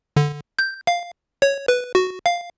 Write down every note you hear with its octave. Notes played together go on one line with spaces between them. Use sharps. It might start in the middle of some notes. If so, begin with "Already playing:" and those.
D3
G6
F5
C#5
B4
F#4
F5